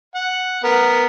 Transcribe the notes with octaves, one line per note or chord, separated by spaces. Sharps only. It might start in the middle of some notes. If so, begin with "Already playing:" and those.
F#5
B3 A#4